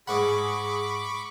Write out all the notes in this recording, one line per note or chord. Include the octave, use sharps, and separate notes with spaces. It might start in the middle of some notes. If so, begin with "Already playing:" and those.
G#2 G#4 F#5 B5 C#6 D6